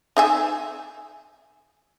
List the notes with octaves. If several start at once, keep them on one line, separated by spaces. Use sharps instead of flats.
D#4 E5 G#5